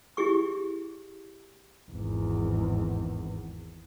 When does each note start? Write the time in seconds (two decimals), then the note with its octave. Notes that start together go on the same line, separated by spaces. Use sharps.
0.17 E4 G4 G#4 C#6
1.91 G#1 E2